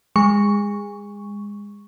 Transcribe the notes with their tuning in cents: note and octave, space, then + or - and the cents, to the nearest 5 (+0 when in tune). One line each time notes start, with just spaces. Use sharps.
G#3 -25 C#6 +0